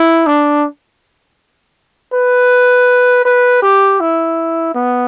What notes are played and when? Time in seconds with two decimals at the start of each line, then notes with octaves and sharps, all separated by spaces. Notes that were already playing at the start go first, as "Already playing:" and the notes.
Already playing: E4
0.27 D4
2.13 B4
3.25 B4
3.62 G4
4.00 E4
4.74 B3